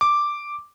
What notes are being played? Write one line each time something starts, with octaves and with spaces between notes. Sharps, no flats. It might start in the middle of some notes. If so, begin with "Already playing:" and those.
D6